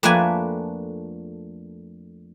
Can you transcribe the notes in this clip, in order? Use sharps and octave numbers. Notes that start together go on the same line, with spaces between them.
F2 A3 A#3 D4 B4 G#5